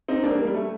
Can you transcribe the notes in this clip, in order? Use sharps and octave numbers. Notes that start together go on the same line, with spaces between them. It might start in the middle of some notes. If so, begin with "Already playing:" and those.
C4 D#4
A#3 D4
G3 A#3
G3
A3